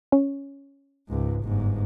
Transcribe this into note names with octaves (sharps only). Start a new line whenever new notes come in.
C#4
C#2 G#2
G1 G#2